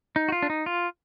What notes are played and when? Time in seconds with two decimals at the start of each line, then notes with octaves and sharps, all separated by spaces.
0.16 D#4
0.29 F#4
0.32 F4
0.43 D4
0.50 D#4
0.66 F4